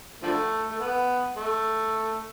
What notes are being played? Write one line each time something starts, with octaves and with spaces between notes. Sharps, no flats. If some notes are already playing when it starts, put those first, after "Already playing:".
D3 F3 A3
A3
B3
A3